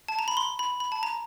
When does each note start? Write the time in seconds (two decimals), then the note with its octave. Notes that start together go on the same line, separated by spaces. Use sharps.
0.08 A5
0.19 A#5
0.28 B5
0.37 C6
0.59 B5
0.80 B5
0.92 A5
1.03 A#5